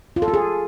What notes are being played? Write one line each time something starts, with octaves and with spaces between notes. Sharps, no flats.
F4
A4
F4
G#4